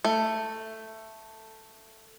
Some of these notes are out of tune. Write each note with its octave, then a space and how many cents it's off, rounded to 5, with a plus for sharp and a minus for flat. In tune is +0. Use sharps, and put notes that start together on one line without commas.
A3 +10